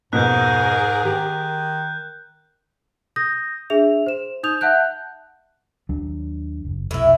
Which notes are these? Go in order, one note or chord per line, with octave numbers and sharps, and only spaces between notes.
F2 G#2 B2 G#4 A#4 F#6 G6
D#3 G4
D#6 G6 A#6
D4 G#4 E5 F7
C5 E7
D#4 D#6 G6 F7
E5 F#5 A5 F#6 G6
D#2 F#3 D4
F#1
F1 B1 A2 E4